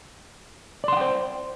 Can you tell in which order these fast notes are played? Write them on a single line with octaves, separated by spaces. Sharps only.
D5 C6 F#5 G5 C5